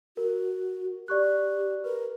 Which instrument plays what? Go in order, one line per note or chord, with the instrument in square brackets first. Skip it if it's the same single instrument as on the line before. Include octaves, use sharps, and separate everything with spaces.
[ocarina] F#4 [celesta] A#4
[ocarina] G4 [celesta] D5 C#6 F#6
[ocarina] A#4 [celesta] B4